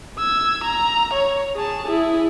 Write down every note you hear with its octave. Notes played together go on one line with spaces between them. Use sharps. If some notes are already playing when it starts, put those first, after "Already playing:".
E6 G#6
A#5
C#5
G#4 A5
E4 G#4